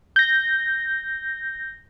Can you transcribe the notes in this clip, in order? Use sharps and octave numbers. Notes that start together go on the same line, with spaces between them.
G6 A#6